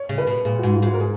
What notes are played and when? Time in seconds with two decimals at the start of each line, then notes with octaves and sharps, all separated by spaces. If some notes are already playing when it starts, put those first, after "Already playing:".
Already playing: C#5
0.09 C#3
0.18 B4
0.27 B2
0.45 A#2 G#4
0.59 G#2 F#4
0.73 F4
0.82 G#2 F#4
0.94 A#4
1.00 G#4